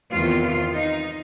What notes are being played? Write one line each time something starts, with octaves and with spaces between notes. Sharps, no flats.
E2 C3 D#3 F4
F4
D#4